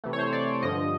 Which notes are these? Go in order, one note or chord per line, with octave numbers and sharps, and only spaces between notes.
C3 E3 A3
C#5
C5
D5
G2 D3 F3 D#5